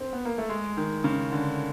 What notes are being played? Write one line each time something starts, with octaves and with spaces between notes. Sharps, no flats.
C4
B3
A#3
A3
G#3
D#3
C#3
D3